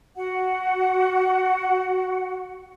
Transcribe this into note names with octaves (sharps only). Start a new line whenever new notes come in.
F#4 F#5